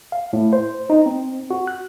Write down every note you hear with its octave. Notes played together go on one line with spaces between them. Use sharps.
F5
A2
C5
D#4
C4
F#4
F#6